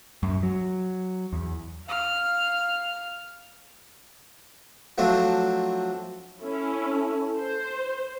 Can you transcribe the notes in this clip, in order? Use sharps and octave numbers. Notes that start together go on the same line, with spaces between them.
F#2
F#3
E2
F5 F6
F3 F#3 A3 C4 D4
C#4 E4 A4
C5